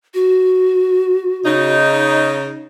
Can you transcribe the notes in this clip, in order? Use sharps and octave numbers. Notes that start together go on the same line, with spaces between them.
F#4
C#3 D#4